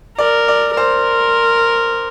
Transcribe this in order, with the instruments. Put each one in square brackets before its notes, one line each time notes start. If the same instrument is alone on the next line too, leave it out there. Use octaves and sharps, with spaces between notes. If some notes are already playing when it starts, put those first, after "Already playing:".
[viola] A#4 [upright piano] D5
[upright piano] D5
[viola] A#4 [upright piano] C5